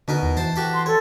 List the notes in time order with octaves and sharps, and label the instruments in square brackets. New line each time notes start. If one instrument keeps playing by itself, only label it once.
[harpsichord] B2 D#4 A#4 [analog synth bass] D3
[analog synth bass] E2
[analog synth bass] E3 [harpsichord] C5 A5
[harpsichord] F#4 G4 A4
[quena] C6
[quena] A4 [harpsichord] C#5